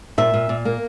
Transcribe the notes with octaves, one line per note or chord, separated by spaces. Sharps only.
A#2 E5
A#2
A#2
A#3